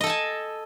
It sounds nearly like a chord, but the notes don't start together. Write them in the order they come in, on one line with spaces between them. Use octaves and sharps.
D#5 A4 A5 G#5